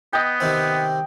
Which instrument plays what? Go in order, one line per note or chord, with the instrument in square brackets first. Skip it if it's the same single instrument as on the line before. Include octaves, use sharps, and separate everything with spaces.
[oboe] B3 [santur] D#5 G5
[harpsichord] C3 D#3 C4